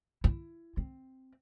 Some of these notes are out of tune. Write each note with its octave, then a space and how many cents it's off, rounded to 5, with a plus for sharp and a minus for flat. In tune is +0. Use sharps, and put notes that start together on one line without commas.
E4 +25
C4 +0